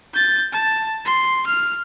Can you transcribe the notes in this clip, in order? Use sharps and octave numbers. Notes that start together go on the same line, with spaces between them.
G6 A6
A5
C6
F6